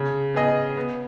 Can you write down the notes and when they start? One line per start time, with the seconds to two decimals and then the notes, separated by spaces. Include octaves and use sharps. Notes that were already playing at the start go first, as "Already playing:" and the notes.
Already playing: C#3
0.34 B3 G#4 D#5
0.77 B3